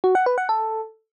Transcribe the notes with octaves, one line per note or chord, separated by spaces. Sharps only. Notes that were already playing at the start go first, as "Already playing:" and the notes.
F#4
F#5
B4
F#5
A4